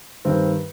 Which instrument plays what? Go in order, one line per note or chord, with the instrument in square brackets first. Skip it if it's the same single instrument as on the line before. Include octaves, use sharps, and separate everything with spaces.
[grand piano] G2 D#3 C4